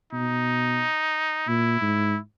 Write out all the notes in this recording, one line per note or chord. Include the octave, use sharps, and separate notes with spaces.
B2 D#4
A#2 E4
G#2